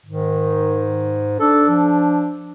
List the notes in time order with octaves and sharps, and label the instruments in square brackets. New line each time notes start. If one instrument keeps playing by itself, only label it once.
[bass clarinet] G#2 [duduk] D#3
[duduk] D4 [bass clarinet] A4
[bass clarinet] F3